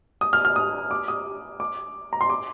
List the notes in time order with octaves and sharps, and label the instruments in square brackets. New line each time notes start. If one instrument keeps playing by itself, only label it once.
[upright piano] D#6
F6
F6
D#6
D6
D#6
D6
A#5
C6
D6